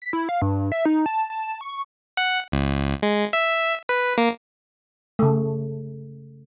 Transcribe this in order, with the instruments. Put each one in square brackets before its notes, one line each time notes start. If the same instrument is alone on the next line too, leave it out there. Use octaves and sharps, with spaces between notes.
[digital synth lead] B6
E4
F5
G2
E5
D#4
A5
A5
C#6
[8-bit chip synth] F#5
C#2
G#3
E5
B4
A#3
[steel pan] C#3 A3